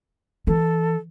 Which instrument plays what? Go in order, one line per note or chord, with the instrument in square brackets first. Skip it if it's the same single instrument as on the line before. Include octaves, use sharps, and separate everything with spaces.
[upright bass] E3 [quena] A4